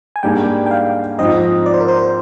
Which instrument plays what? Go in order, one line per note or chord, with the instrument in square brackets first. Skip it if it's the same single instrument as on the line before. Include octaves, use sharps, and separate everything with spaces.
[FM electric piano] G#5
[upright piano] G#2 G3 A#3 D4 G#4 [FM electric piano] G5
[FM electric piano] G5
F5
[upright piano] G#2 F3 C4 [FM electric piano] D#5
[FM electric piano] D5
C5
A#4
C5